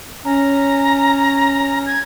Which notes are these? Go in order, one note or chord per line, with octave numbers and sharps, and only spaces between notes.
C#4 A#5
G#6